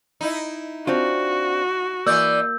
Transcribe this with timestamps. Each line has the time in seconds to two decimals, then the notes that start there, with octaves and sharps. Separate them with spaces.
0.21 D#4 E4
0.87 C4 D4 F4 F#4
2.06 E3 A#3 D5 E6 G6